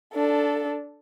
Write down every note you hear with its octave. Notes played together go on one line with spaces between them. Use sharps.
D4 A4